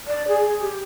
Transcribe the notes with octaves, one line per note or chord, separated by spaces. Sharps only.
D5
G#4
G4